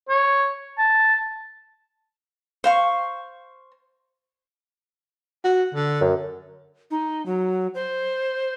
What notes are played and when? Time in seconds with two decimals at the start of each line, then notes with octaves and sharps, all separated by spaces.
0.09 C#5
0.78 A5
2.64 C5 F5 C#6
5.45 F#4
5.74 D3
6.01 F#2
6.91 D#4
7.26 F#3
7.75 C5